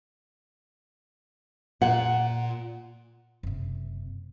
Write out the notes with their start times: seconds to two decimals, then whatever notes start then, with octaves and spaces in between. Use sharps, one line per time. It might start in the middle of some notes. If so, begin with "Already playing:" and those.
1.82 A#2 F#5
3.43 F#1 C3